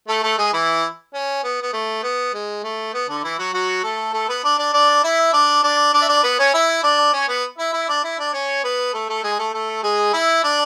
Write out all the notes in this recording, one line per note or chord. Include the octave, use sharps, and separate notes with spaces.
A3 A4
A3 A4
G#3 G#4
E3 E4
C#4
B3
B3
A3
B3
G#3
A3
B3
D3 D4
E3 E4
F#3 F#4
F#3 F#4
A3 A4
A3 A4
B3 B4
D4 D5
D4 D5
D4 D5
E4 E5
D4 D5
D4 D5
D4 D5
E5
D4 D5
B3 B4
C#4 C#5
E4 E5
D4 D5
C#4 C#5
B3 B4
E4 E5
E4 E5
D4 D5
E4 E5
D4 D5
C#4 C#5
B3 B4
A3 A4
A3 A4
G#3 G#4
A3 A4
A3 A4
G#3 G#4
E4 E5
D4 D5